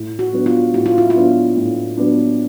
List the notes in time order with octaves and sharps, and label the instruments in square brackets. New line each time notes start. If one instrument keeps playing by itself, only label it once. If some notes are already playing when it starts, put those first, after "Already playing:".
Already playing: [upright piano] A2
[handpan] F#4
[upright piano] F#3 B3 D4
[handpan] F4
[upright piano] A2 [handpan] F#4
[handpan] F4
E4
F4
[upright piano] F#3 B3 D4
A2
F#3 B3 D4